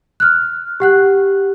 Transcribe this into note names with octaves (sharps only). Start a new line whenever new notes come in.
F6 F#6
G4 F#5 F#6